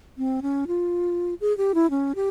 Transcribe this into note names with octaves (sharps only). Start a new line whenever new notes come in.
C4
C#4
F4
G#4
G4
E4
C#4
G4